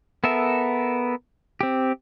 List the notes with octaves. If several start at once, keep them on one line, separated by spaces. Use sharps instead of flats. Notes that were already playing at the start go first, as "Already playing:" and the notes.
B3 A4 A#4 E5
C4 G4